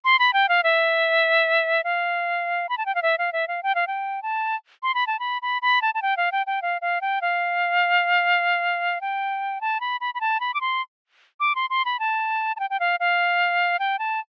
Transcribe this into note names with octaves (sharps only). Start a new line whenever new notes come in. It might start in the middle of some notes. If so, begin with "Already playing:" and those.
C6
B5
G5
F5
E5
F5
B5
A5
G5
F5
E5
F5
E5
F5
G5
F5
G5
A5
C6
B5
A5
B5
B5
B5
A5
A5
G5
F5
G5
G5
F5
F5
G5
F5
G5
A5
B5
B5
B5
A5
B5
D6
C6
D6
C6
C6
B5
A5
A5
G5
G5
F5
F5
G5
A5